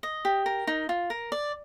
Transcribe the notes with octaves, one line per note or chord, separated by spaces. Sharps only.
D#5
G4
A#4
D#4
F4
A#4
D5